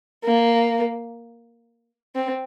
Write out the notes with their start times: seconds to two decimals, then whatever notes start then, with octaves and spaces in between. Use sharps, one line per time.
0.24 A#3
2.15 C4